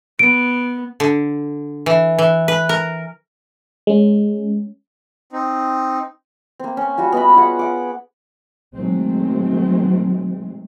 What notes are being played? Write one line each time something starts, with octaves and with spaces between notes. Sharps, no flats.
B3 D7
D3
E3
E3
B4
A#4
G#3 C#4
C4 D#4
A#3 C4
C#4
G3 F4 F#4
B3 D#5 B5
F4 G#4 F#5
F#5 D6
B2 D#3 F#3 G#3 A3 C4